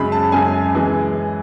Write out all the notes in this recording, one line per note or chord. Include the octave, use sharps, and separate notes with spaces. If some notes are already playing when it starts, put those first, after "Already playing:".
Already playing: F#2 C#3 G#3 B5
A5
F#2 C#3 G#3 G#5
E3 G#3